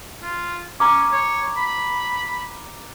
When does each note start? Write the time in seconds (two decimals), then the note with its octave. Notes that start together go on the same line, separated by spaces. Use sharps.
0.23 F4
0.80 C#4 A#5 D6
1.12 C#5
1.57 B5